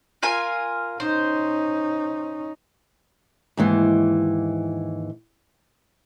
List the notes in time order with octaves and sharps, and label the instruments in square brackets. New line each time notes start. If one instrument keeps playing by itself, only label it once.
[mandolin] F4 A#4 G#5
[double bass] C#4 D#4 [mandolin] C5
[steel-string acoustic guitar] D#2 G#2 E3